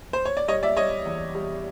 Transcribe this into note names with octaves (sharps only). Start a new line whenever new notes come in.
C5
C#5
D5
G3 C#5 D#5
D5 E5
G3 C#5 D#5
E2
G3